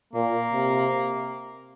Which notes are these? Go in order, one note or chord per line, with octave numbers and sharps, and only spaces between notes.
A#2 A#3
C3